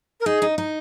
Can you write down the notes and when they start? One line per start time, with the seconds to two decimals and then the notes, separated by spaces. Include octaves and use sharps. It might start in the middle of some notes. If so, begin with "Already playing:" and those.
0.20 A#4
0.26 D#4 G#4
0.42 D#4
0.58 D#4